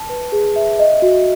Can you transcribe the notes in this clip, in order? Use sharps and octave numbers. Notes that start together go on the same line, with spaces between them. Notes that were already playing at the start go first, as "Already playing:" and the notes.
Already playing: A5
B4
G#4
E5
D#5
F#4